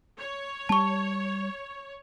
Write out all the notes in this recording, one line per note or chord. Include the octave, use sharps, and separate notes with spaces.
C#5
G3 A5 C#6